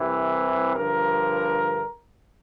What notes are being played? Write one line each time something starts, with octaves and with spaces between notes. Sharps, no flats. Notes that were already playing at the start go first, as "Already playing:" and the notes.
Already playing: C2 C3 E3
G2 D3 F3 A#4